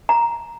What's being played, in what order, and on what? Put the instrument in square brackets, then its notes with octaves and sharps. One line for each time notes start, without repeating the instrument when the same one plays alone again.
[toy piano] A#5